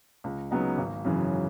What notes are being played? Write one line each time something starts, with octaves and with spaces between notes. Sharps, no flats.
C#2
C#3 F#3 B3 D#4
G#1
F#2 C#3 E3